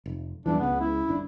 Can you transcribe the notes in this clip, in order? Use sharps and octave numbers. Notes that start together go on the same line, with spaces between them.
F1
E2 G2 E3 D4
C#2 C#3 B3
E4
G1 D4